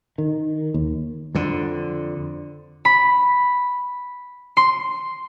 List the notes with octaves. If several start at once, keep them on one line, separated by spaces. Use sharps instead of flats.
D#3
D#2
F2 D3
B5
C6